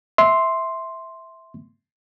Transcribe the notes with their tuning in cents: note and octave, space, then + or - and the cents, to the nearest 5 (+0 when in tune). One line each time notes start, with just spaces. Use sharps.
E5 -10 C6 +0